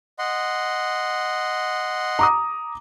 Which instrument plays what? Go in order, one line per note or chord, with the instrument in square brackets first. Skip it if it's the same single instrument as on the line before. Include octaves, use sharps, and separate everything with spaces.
[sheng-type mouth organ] D#5 F#5 C6
[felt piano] A#5 D6 D#6